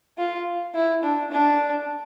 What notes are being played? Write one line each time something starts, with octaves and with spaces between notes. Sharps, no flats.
F4
E4
D4
D4